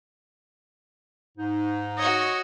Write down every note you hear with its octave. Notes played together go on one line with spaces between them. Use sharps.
G#2 D#4
F#4 C#5 D#5